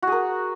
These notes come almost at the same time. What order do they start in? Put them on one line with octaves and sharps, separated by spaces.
F#4 G#4 A#4